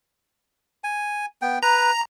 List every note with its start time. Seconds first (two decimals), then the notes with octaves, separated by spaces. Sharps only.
0.84 G#5
1.42 B3 G5
1.63 B4 A#5